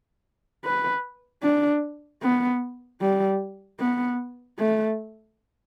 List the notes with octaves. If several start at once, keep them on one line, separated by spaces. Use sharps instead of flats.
B4
D4
B3
G3
B3
A3